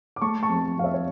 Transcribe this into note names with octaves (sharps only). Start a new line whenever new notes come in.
D6
A3 A5 C#6
A5 C#6
F2
F2 F5
C#5 E5
C#5